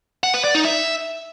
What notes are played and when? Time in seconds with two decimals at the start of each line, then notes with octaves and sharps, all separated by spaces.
0.24 F#5
0.34 B4
0.44 D5
0.55 D#4
0.65 E5